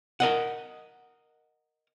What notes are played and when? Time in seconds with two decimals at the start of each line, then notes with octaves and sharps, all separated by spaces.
0.20 A#4 D#5 F#5